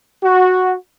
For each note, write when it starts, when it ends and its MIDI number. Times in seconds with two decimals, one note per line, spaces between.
0.23 0.74 66